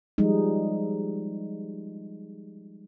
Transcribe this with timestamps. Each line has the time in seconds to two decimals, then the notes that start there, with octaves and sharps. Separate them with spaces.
0.18 F3 G3 G#3 D#4